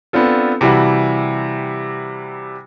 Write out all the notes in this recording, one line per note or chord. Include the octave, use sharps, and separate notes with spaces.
B3 C4 D4 F4 A4
C3 E3 G3 E4 F#4